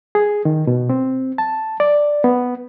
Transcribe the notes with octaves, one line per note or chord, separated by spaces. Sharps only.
G#4
D#3
B2
C4
A5
D5
B3